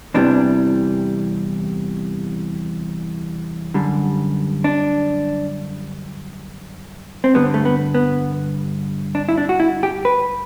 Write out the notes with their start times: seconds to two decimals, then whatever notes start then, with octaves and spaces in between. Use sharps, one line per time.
0.14 E2 C3 E3 G3 D4
3.74 F#2 D3 G3
4.64 D4
7.24 C4
7.34 G2 D3 G3 B3
7.54 A3
7.65 B3
7.94 B3
9.15 D4
9.29 E4
9.38 D4
9.49 F#4
9.60 E4
9.83 G4
10.05 B4